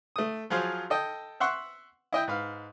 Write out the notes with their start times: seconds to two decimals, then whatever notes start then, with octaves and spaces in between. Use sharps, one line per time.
0.16 A3 D#6
0.50 F3 F#3 F4 G#4 C5
0.90 A4 D#5 G5
1.40 E5 F#5 C6 C#6 E6 F#6
2.12 E4 D#5 G5
2.28 G#2 B4 F5